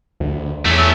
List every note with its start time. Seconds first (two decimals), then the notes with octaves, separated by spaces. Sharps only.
0.20 D2
0.65 E2 A3 C#4
0.77 E6